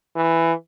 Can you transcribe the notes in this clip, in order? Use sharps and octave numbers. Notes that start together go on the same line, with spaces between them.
E3